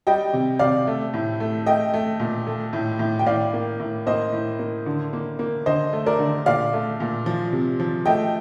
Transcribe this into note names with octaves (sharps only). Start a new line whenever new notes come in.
G3 D#5 G5
C3
C3 D5 F5
A3
A2
A3
A3 D#5 G5
A3
A#2
A3
A2
A2
G5
A2 D5 F5
A#3
A2
A#3 C5 D#5
A2
A#3
D3
A#3
A#3
D3 C5 D#5
A3
A#4 D5
D3
A#2 D5 F5
A3
A#2
F3
C3
F3
A3 D#5 G5